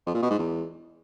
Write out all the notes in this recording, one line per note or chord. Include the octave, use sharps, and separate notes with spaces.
F2
A#2
B2
G#2
E2